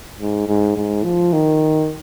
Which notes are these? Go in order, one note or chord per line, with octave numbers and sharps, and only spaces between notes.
G#2
G#2
G#2
F3
D#3